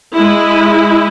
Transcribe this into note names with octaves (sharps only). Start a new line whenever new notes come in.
G#3 E4